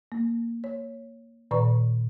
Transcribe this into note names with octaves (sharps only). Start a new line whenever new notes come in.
A#3
C#5
A#2 D#3 B4 D5 A#5 C#6